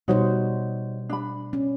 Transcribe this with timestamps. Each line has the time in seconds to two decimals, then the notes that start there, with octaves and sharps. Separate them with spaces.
0.08 B2 G3 D#4 F#4 C5 C#5
1.10 D4 B5
1.53 C#4